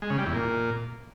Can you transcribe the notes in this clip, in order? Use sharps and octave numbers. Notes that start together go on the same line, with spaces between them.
G#3
C#3
G3
E2
A#2